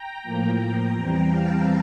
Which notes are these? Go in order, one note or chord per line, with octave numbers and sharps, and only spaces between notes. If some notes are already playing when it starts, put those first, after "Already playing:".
Already playing: G5 A#5
A2 F3 A#3
G5 A#5
E2 E3 G3 C4
F5 A5